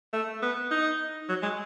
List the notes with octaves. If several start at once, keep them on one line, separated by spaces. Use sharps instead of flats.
A3
B3
D#4
F#3
G#3